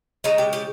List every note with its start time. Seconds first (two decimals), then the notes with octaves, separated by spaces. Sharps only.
0.24 C#3 F3 G#3 D#4
0.38 G4
0.53 G4